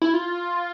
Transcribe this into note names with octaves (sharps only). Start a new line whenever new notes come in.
E4
F4